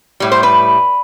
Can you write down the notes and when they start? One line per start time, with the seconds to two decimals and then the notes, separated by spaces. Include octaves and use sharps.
0.20 A2 G3
0.32 C5
0.43 B4